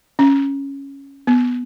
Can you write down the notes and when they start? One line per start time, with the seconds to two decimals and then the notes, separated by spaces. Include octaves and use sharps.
0.19 C#4
1.27 B3